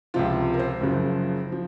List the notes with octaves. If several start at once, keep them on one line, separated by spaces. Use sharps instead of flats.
C#2 C3 F3 F4
A#4
C5
F#1 F#2 C#3 F3
F3